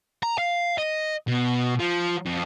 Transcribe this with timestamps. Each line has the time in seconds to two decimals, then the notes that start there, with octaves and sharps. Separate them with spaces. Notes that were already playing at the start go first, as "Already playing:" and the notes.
0.23 A#5
0.38 F5
0.78 D#5
1.28 B2
1.80 F3
2.25 F2